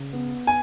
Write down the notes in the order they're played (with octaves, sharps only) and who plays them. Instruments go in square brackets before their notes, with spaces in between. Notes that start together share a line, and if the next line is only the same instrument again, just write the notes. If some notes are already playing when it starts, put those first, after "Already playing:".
Already playing: [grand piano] C#3
B3
[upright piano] G#5